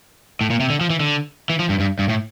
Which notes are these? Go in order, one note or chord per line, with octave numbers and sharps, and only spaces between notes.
A2
A#2
C3
D3
F3
E3
D3
E3
F3
G2
G2
G2
A2